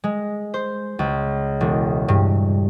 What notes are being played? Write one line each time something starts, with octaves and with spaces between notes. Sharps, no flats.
G#3
C5
C#2
E1
G2